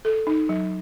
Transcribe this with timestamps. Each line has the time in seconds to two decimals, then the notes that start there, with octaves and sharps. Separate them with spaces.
0.05 A4
0.27 D#4
0.49 F#3